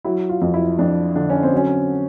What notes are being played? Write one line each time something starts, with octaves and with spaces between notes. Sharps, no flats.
F#3 E4
F4
F2
E4
F2 D4
D3 D4
C#4
C4
F#3 C#4